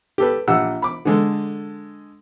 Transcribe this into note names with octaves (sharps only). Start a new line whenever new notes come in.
G4 A4 B4
A#1 G4 F#5 E6
B5 D6
D3 G#3 A4